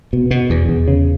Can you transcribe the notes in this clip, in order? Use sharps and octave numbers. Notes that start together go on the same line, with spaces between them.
B2
B2
E2
E2
C#3